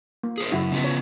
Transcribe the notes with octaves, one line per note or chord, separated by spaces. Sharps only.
A#3
G#4 A#4 C5
F#2 C#3 E4 F#4
C#3 F3 B3
C#5